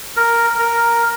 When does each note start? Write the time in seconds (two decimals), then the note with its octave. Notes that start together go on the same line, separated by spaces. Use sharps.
0.17 A#4
0.59 A#4